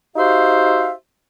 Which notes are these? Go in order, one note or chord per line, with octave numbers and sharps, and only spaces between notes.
D#4 F#4 G4 C5 E5 F5